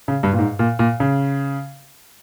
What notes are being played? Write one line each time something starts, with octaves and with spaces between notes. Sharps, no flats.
C#3
G2
A#2
G#2
A#2
A#2
C#3